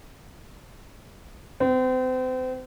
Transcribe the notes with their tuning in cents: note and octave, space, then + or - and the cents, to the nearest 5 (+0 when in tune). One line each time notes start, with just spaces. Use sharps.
C4 -35